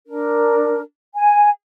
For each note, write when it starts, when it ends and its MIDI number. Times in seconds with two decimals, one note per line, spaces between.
0.07 0.81 62
0.07 0.81 70
1.14 1.50 80